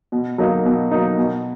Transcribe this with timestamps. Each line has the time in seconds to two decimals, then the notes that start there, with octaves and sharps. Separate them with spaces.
0.12 B2
0.38 F#3 A#3 D#4
0.65 B2
0.91 F#3 A#3 D#4
1.18 B2